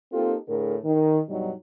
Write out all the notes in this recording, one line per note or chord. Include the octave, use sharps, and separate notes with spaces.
A#3 C4 D#4 F4 G4 A4
A2 D3 G#4 A#4
D#3
G2 B2 F#3 G3 D#4